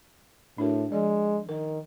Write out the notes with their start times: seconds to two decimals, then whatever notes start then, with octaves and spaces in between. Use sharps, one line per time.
0.58 A2 D4 F#4 A#4
0.92 F3 G#3 D5
1.49 D#3 A#4